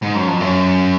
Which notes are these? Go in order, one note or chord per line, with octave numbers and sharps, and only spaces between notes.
G#2
F#2
F2
F#2